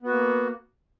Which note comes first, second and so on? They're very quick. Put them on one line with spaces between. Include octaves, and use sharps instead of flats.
B3 F#4 A#3